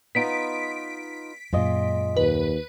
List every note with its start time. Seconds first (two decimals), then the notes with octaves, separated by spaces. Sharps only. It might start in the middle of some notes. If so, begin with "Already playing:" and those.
0.15 B3 D#4 F4 B6 D7
1.53 F#2 A#2 G#3 F4 D#5
2.17 D#2 B4